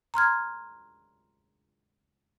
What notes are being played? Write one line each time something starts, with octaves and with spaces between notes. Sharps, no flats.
A#5 C6 F6 G#6